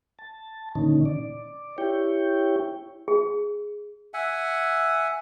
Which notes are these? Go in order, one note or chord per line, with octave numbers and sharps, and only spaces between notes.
A5
A#2 D3 D#3 C#4 D#4
D5
E4 G4 C#5 G5
G#4
E5 F#5 G#5